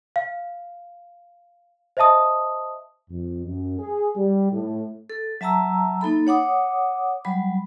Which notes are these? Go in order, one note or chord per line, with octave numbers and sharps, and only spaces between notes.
F5
C5 D#5 E5 A5 D#6
F2
F#2
G#4
G3
A2
A4
F#3 E5 A5 A#5 E6
A#3 D#4 A4 B5
C#5 F#5 D6 D#6
F#3 G3 B5